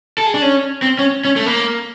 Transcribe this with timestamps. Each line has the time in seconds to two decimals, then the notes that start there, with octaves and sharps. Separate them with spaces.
0.18 A4
0.26 G#4
0.34 D4
0.42 C#4
0.82 C4
0.99 C#4
1.25 C#4
1.36 A3
1.46 A#3